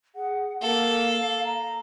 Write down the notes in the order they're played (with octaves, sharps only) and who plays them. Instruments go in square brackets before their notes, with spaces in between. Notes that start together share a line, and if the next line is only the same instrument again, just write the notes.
[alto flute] G#4 [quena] F#5
[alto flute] A#3 [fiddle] A4 [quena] F5
[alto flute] A#5